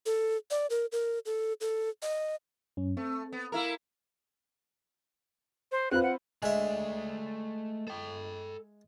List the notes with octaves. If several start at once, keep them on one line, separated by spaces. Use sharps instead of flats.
A4
D5
A#4
A#4
A4
A4
D#5
F#2 C#4
A3 C4
B3
A#3 E4 A#4
C5
C4 F4 B4 F#6
F#5
G#3 A3 D5 E5
A4 G5